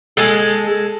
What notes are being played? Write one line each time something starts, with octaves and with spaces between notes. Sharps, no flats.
G#3 A4